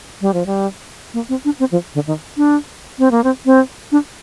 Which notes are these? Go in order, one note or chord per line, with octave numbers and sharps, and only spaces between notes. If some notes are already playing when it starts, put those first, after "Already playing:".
G3
F3
G3
A#3
C4
D4
C4
F3
D3
D#3
D4
C4
A#3
C4
C4
D4